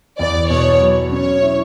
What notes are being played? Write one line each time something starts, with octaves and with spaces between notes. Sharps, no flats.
E2 D5
B2 C#5
F#3
C#4 C#5
E4